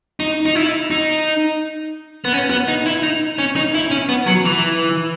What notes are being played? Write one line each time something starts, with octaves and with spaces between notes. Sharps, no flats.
D#4
D#4
E4
D#4
B3
C#4
B3
D#4
E4
D#4
C#4
D#4
E4
C#4
B3
F#3
E3